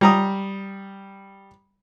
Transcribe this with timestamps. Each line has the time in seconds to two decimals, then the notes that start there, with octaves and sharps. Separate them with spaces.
0.01 G3 A#5 D#6